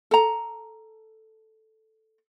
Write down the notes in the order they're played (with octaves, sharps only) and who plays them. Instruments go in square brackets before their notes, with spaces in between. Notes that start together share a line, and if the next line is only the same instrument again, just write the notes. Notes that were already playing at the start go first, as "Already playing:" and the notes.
[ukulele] A4 A#5